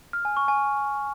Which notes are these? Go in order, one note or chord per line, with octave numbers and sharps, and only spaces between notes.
F6
G#5
C#6
G#5